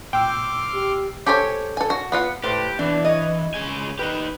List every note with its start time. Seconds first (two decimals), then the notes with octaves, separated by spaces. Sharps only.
0.13 A#2 G5 C6 D6 E6 F6
0.74 G4
1.26 G4 A4 C5 C#5 G#5
1.77 A4 G#5
1.90 F#4
2.12 B3 F4 F#5
2.44 A2 G4 B4 C5
2.79 B2 E3 D4
3.05 C#5 D#5
3.54 C#3 G#3 G#5
3.99 D#4 G4 B4